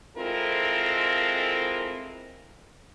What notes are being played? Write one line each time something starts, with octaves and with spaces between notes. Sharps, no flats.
G#3 C4 E4 F4 A4 A#4